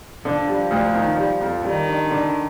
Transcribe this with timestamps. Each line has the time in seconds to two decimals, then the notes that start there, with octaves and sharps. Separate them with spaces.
0.25 D3 F3
0.48 G3
0.71 D2
0.94 D#3
1.17 G3
1.41 F2
1.64 D#3 G3
1.87 D4
2.11 D3